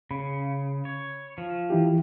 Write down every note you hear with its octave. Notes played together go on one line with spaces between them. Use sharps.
C#3 B5
C#5
F3
E3 E4 G4